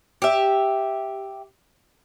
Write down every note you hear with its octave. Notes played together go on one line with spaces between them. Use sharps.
G4 E5